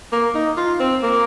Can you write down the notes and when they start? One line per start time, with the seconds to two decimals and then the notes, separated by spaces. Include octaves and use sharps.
0.12 A#3
0.35 D#4
0.57 F4
0.80 C4
1.03 A#3